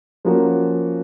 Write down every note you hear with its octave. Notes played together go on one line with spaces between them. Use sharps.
F3 A#3 C#4 F#4